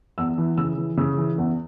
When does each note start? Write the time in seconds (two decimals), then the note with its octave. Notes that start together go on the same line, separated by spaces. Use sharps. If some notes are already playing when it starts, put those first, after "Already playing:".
0.18 E2 E6
0.38 E3
0.58 C#3 E6
0.78 E3
0.97 C#3 E6
1.18 E3
1.38 E2